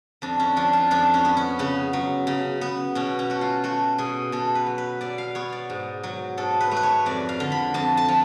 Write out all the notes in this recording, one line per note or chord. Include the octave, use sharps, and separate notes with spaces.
F2 D4
C#4
F3 D4
F4
F2 D4
C#4
B3
C#4
C#3 B3
F#3
C#3
B3
B2 C#4
C#4
A3 F#4
F4
A3 F#4
B2 G#4
B2 A4
B4
F#3
B4
B2 D5
F5
B3 C#5
D5
G#2
F#3
G#2 A4
B4
A3
B4
C#5
F2 D5
F5
D3
B5
F2 A5
A5
F3